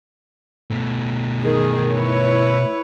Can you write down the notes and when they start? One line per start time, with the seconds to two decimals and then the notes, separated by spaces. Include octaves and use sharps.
0.71 B2 A3
1.42 D#3 G#4
1.91 E4 B4 C#5